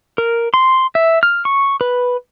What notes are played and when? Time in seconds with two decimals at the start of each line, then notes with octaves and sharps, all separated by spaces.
0.18 A#4
0.54 C6
0.95 E5
1.23 F6
1.45 C#6
1.81 B4